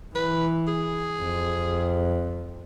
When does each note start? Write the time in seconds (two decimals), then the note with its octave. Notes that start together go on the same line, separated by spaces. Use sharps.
0.15 E3 B4
0.68 G#4
1.22 F2